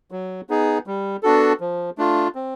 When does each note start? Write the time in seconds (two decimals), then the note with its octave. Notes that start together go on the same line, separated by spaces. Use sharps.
0.11 F#3
0.49 B3 D#4 G#4
0.87 G3
1.23 B3 D4 F#4 A4
1.60 F3
1.98 A3 D4 F4
2.35 C4